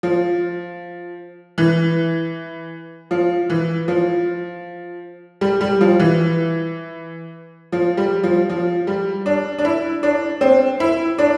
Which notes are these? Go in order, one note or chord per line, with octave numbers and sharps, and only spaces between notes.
F3
E3
F3
E3
F3
G3
G3
F3
E3
F3
G3
F3
F3
G3
D4
D4
E4
D4
C4
E4
D4